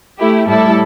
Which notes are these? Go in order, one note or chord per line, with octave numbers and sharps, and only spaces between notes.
A3 E4 G4
A2 G3 E4 A4